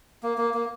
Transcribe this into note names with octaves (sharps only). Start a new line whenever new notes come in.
A#3
A#3
A#3